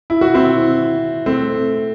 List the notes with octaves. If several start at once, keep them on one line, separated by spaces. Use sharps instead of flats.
E4
F#4
C4 E4
A3 C4